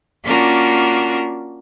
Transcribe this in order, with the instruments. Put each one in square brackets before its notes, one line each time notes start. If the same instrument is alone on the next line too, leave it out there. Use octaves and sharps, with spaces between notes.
[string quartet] A#3 C#4 D4 F4 F#4 A#4